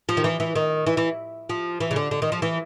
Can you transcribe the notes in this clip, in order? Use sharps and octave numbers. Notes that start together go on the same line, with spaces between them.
F3
D#3
E3
E3
D#3
E3
E3
F3
E3
C#3
D3
D3
D#3
F3
E3